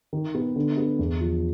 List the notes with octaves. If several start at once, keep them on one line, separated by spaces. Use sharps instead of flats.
D#3
B3
D3
B3
E2
F3